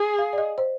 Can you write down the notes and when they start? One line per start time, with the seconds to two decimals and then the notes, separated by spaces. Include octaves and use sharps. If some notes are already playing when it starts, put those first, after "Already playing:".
Already playing: G#4
0.18 F5
0.33 D5
0.38 D#5
0.58 C5